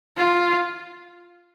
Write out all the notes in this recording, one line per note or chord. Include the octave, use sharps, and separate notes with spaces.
F4